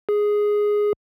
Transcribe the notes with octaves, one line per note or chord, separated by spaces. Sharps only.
G#4